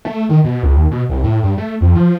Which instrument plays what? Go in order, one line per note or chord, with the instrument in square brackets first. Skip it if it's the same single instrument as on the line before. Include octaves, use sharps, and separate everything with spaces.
[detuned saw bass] A3
D#3
B2
C#2
D#2
B2
C2
A2
G2
A3
F2
F3